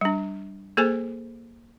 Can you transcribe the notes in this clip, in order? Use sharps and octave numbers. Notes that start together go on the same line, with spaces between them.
G3 D4
A#3 G#4 A4 C5 G#5